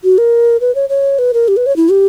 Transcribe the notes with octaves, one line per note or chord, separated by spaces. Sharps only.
F#4
A#4
B4
C#5
C#5
B4
A#4
G4
B4
C#5
E4
G4